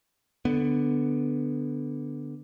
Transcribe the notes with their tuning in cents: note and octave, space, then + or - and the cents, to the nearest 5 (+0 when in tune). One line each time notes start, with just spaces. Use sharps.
D3 +0 B3 +0